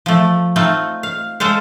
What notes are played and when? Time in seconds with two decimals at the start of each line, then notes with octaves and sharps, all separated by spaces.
0.06 F3 A3
0.56 A3 C4 D#4 F4
1.03 F5
1.40 G#3 A4 C5 F5